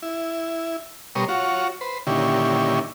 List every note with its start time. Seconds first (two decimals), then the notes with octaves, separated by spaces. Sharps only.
0.02 E4
1.15 B2 G3 A#4 C#5 C6 D#6
1.29 F4 F#4 C#5
1.81 B4 C5
2.07 A#2 D3 D#3 C#4 E4 G4